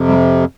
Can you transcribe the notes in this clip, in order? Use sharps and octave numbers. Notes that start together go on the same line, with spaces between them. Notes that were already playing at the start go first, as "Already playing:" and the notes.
Already playing: F2 C3
G3